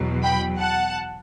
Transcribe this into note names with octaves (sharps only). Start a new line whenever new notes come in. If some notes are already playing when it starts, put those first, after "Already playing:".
Already playing: E2 B2 F#3
G5 B5
F#5 A5